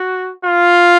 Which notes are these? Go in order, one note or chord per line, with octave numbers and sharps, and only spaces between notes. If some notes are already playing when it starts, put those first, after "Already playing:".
Already playing: F#4
F4